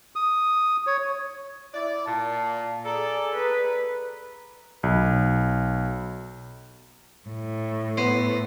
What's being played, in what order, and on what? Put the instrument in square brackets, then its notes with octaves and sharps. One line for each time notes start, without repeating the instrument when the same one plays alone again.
[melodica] D#6
C#5
[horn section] E4 D5
[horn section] A#2 [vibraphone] A5
[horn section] G#4 A4 [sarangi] D5 [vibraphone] A#5
[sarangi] B4
[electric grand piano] B1
[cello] A2
[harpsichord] B3 C5